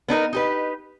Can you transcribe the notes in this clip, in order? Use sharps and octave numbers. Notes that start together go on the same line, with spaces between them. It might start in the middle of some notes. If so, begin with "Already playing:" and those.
B3 D4 D#4 A#4
D#4 G4 B4